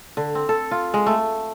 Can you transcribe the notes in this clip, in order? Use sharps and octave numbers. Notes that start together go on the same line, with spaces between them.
D3
C4
A4
F4
G#3
A3